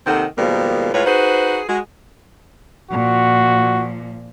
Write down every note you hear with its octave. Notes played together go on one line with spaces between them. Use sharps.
D#2 C3 D#3 C4 A4 F#5
B2 D#3 F3 G3 G#3 A#3
A2 G#3 F4 B4 C#5
D#4 F#4 G#4 B4 C5
G#3 F#4
A#2 F3 F#4